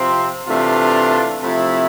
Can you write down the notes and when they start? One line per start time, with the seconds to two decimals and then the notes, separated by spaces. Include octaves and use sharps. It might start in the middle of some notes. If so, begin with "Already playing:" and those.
Already playing: C3 F3 C4
0.47 C3 E3 A3 D4 F4
1.42 C3 F3 A3 E4